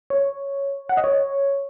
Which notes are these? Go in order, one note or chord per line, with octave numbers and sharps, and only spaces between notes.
C#5
F#5
D#5
C#5